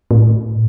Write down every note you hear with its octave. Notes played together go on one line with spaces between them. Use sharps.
A2